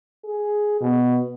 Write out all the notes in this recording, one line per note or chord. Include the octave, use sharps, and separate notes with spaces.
G#4
B2